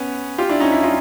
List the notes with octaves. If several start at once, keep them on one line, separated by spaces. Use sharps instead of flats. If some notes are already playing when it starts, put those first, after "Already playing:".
Already playing: B3 C#4
F4 G4
D4 E4
C#4 D#4
D4 E4
D#4 F4